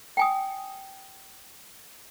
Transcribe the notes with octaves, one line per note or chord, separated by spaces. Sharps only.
G5 G#5 D#6